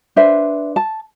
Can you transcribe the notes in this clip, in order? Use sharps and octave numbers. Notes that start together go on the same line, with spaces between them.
D4 B4 C5 E5
A5